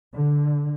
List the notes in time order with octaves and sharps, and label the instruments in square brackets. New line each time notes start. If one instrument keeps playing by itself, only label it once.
[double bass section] D3